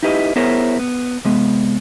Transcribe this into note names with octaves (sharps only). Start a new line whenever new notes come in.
D#4 E4 G4 B4 D5 D#5
B3 E4 G#4 A#4 C5 C#5
B3
C3 G#3 B3